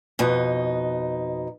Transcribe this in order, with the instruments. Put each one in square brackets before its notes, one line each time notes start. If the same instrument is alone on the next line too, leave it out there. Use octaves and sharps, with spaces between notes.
[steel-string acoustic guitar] F2 B2 D#4